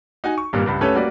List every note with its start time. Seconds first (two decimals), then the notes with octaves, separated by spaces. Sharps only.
0.24 D#4 F#4 G#5
0.38 C#6
0.53 G#1 G2 A#2 G3 A#3 G4
0.66 C#2 G2 B5
0.81 A3 C#4 G4 A4 B4 C#5
0.94 G3 A#3 F#4 B4 D5